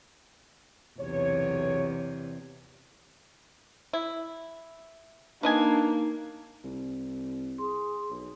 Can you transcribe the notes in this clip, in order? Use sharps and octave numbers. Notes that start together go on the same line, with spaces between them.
B1 E2 C3 C#5
E4
A#3 D4 D#4 B4 D#5 G#5
C2
G#4 C6
B1